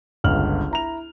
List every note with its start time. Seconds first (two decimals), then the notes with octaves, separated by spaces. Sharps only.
0.24 G1 C#2 F6 F#7
0.71 E4 A#5 F7